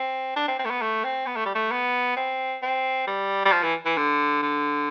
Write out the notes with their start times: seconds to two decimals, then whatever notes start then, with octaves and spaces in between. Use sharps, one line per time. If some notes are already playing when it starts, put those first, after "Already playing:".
Already playing: C4
0.36 D4
0.48 C4
0.59 C4
0.65 A3
0.70 B3
0.81 A3
1.04 C4
1.26 B3
1.36 A3
1.45 G3
1.55 A3
1.71 B3
2.16 C4
2.62 C4
3.07 G3
3.45 G3
3.52 F3
3.63 E3
3.85 E3
3.97 D3
4.42 D3